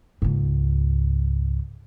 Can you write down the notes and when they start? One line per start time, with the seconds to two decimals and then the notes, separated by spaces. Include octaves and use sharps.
0.22 C#2 G#2